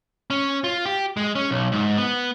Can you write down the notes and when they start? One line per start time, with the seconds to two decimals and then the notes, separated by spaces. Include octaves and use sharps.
0.30 C#4
0.64 F4
0.85 G4
1.17 G#3
1.35 C#4
1.51 B1
1.72 G#2
1.98 B3